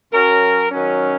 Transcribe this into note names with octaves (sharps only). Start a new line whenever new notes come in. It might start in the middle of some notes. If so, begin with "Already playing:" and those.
F#2 F#3 C#4 A#4
F#2 D#3 F#3 C#4